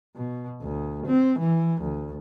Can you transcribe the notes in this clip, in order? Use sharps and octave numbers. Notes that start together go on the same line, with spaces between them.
B2
D2
C4
E3
D2